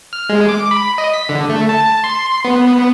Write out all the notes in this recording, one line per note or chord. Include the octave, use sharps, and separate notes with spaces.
F6
G#3
D6
B5
D#5
B6
D3
A3
A5
C6
B3